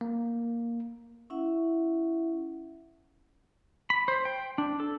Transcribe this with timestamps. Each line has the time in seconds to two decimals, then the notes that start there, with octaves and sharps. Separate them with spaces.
0.01 A#3
1.30 C#4 E4 E5 F#5
3.90 B5
4.08 C5
4.25 G5
4.58 D4
4.80 A4